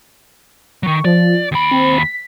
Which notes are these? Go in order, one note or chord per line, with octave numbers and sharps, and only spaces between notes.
D#3 F#3 C#6
F3 D5
D#2 B5 D7
C4
B6